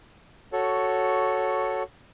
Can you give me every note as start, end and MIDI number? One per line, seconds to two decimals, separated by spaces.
0.53 1.83 66
0.53 1.83 69
0.53 1.83 73